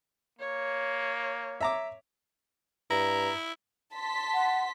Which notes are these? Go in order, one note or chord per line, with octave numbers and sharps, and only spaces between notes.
A#3 C#5
E5 A#5 D6
G2 E4 A#5
A5 C6 B6
F#5